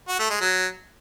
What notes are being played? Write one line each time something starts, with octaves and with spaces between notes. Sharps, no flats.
F#4
A3
G#3
F#3